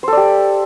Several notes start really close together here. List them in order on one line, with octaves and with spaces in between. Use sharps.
C5 A4 D5 G4